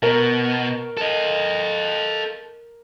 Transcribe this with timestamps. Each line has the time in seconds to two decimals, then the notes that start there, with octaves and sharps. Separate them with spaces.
0.03 B2 A#4
0.97 A4 D#5